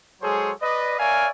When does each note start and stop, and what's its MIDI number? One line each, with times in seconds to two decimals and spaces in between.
0.22 0.52 54
0.22 0.52 56
0.22 0.52 68
0.22 0.52 69
0.22 0.52 72
0.22 0.52 73
0.61 0.98 71
0.61 0.98 74
0.61 0.98 75
0.98 1.29 70
0.98 1.29 73
0.98 1.29 74
0.98 1.29 76
0.98 1.29 77
0.98 1.29 80